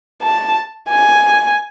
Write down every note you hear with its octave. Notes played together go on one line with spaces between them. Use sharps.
A5
G#5